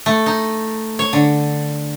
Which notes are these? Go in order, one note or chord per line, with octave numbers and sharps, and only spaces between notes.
A3
D#4
C#5
D3